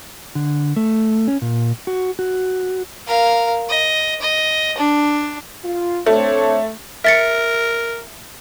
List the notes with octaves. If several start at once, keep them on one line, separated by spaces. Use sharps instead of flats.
D3
A3
C#4
A#2
F#4
F#4
A#4 F5
D#5
D#5
D4
F4
A3 C4 D4 C#5
A#4 E5 A6 C#7